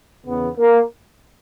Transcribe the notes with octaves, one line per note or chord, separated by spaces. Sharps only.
E2 C#3 E3 B3
A#3